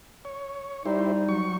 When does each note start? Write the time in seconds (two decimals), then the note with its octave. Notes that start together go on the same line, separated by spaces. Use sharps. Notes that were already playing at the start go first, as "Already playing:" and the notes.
0.25 C#5
0.86 G3 D#4 E4 G4 C5
1.29 F#3 C#6